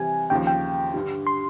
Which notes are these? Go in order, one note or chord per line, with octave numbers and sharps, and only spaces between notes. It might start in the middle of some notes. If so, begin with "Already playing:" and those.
Already playing: C3 E3 G3 G#5
D#2 C#3 F3 G5
G5
G2 D3 G3
C6